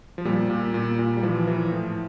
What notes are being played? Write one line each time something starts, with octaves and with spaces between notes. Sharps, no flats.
F3
A#2 G3
A#2
A#2
A#2
G3
E3 F3
E3
A2